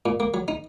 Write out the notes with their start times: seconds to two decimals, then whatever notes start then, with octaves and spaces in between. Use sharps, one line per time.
0.06 A#2
0.20 A#3
0.34 F#3
0.48 D#4